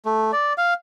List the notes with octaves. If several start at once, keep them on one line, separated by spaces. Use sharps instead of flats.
A3
D5
F5